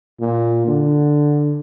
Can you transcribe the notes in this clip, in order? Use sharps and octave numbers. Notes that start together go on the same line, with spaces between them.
A#2
D3